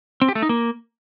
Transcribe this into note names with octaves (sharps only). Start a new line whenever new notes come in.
C4
G4
A3
D#4
A#3